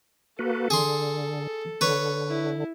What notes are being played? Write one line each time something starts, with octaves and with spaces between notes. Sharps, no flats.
A#3 F#4 A4 B4
D3 G#4 C6
D3 B4 C#5
E4